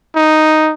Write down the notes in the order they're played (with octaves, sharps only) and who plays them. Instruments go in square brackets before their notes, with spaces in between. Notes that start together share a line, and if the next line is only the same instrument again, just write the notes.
[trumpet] D#4